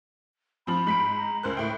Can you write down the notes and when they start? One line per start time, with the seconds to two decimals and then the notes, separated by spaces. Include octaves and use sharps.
0.67 F3 C4 B5
0.87 G#2 B6 D7
1.18 A#5
1.43 C#2 A#4 C5 F#6
1.57 A2 E5 G5